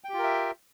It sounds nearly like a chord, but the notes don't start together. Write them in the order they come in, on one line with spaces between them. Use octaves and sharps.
G5 G4 F4 A#4 E5